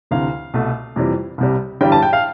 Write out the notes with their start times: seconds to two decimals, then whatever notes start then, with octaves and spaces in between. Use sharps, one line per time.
0.11 D2 C3 E3 F5
0.54 C2 B2 A3
0.96 F2 C3 E3 G3
1.38 C2 C3 G3
1.81 G1 G2 E3 G3 G5
1.92 A5
2.02 G5
2.13 F5